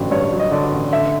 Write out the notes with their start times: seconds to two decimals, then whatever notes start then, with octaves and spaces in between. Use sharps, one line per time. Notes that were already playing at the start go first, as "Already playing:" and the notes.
Already playing: A1 G2 D3 F#3
0.11 G2 C#5
0.32 F#3
0.40 D#5
0.51 D3 D5
0.72 A1
0.93 D3 E5